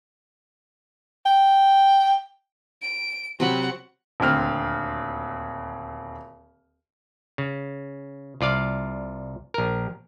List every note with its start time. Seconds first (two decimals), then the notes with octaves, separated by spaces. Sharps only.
1.26 G5
2.82 D7
3.40 C3 F#3 C4 F#5 B5
4.20 D#1 D2 D3 C4 F6
7.38 C#3
8.41 C2 F4 D5 F5
9.54 A#1 A#4